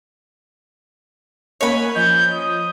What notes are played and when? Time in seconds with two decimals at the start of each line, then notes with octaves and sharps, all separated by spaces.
1.61 A#3 C#4 A#4 C#5 D#5 G#5 B5 F#6
1.96 F3 D#5 G6
2.33 D#6